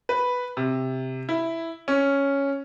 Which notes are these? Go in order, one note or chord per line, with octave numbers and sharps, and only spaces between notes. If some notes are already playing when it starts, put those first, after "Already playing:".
B4
C3
E4
C#4